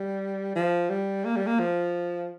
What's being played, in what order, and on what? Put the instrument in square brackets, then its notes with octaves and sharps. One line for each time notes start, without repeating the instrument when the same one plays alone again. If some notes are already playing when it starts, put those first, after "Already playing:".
Already playing: [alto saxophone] G3
F3
G3
A#3
G3
A#3
F3